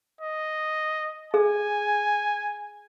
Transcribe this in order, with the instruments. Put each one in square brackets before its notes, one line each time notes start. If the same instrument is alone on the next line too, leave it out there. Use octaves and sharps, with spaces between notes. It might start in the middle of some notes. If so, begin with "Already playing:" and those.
[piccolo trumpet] D#5
[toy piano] G#4 [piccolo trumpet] G#5